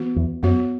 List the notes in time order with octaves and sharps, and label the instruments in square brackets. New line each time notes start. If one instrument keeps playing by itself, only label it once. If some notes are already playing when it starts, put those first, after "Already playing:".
Already playing: [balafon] E3 B3 F#4
[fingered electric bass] E2
[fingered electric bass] F#2 [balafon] B3 F#4 C#5